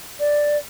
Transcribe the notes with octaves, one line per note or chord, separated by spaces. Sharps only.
D5